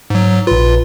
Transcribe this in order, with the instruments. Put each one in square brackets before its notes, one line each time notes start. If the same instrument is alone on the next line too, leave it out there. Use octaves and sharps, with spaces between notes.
[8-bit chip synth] G#2 F#3
[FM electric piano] A#1 B4 [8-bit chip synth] F4